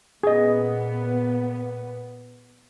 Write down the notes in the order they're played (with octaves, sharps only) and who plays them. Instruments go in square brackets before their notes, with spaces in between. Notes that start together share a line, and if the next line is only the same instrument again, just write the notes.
[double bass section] A#2 B3 [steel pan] G#4 D#5